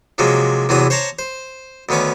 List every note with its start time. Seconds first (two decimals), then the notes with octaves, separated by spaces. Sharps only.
0.18 C3 F3 F#3 G#3 A#3
0.69 E2 C3 E3 F#3 B3 D#6
0.90 C5 C#5 A5 A#5 C#6 D6
1.19 C5
1.89 D2 D#3 B3 C#4 D6